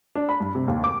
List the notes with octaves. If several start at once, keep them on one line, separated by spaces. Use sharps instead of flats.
D4
B5
G2
C3
D#2
D6